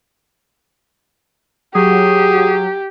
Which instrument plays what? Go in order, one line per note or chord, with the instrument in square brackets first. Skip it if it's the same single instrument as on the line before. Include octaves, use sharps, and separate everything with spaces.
[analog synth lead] F#3 [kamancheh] G4 [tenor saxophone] G#4